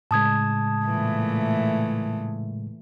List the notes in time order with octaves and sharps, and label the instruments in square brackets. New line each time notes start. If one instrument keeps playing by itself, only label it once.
[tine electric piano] A2 C#3 G#3 [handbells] A5 D#6 G#6
[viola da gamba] A#2 E3 A3